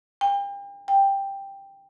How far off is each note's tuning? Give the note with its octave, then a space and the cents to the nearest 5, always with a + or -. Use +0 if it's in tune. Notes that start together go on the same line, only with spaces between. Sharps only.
G5 +35
G5 +5